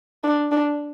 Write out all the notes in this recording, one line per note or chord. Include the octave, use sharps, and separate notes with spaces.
D4
D4